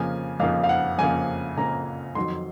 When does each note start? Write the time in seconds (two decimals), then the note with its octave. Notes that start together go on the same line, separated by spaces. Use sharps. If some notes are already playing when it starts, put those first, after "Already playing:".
Already playing: F2 C#3 F3 A#3 G#5
0.40 F2 C#3 F3 A#3 F5
0.63 F5
0.69 F#5
0.98 F2 C#3 F3 A#3 G#5
1.57 F2 C#3 F3 A#3 A#5
2.15 F2 D#3 F#3 C6